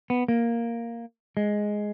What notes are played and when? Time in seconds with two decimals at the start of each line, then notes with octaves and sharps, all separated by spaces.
0.10 B3
0.28 A#3
1.37 G#3